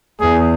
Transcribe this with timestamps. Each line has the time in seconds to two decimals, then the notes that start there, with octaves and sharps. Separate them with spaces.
0.21 E2 G#4